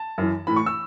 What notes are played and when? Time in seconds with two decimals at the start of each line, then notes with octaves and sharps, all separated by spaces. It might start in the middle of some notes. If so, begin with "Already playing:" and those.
Already playing: A5
0.18 F#2 E3
0.47 A2 E3 B5
0.56 C#6
0.66 E6